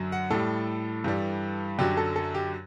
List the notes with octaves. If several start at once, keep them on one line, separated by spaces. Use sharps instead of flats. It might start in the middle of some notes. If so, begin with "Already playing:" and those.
Already playing: F#2 D3 F#3
F#5
A2 G3 A4
G2 E3 G3
F#2 D3 F#3 G4
A4
A4
G4